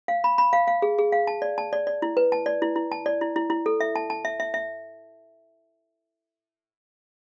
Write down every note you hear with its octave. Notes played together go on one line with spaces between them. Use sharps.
F5
B5
B5
F5
F5
G#4
G#4
F5
A5
D5
A5
D5
D5
E4
B4
A5
D5
E4
E4
A5
D5
E4
E4
E4
A4
E5
A5
A5
E5
E5
E5